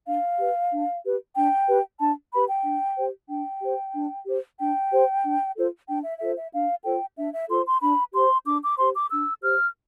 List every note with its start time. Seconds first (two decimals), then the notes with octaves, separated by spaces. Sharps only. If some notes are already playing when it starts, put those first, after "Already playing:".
0.05 D4 F5
0.38 G4 B4
0.71 D4
1.03 G4 B4
1.35 D4 G5
1.67 G4 B4
1.99 D4 A5
2.32 G4 B4 B5
2.48 G5
2.64 D4
2.97 G4 C5
3.28 D4 G5
3.62 G4 C5
3.93 D4
4.25 G4 C5
4.58 D4 G5
4.90 G4 C5
5.23 D4
5.55 F4 A4 C5
5.87 D4 G5
6.03 E5
6.19 F4 A4 C5 E5
6.36 E5
6.52 D4 F5
6.84 F4 A4 C5 G5
7.16 D4 E5
7.33 E5
7.48 F4 A4 C5 C6
7.65 C6
7.81 D4 B5
8.13 G4 C5 C6
8.45 D4 D6
8.61 D6
8.77 G4 C5 C6
8.94 D6
9.10 D4 E6
9.42 G4 C5 F6